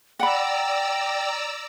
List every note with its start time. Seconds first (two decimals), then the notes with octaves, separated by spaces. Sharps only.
0.19 D5 F#5 G5 A#5 B5 E6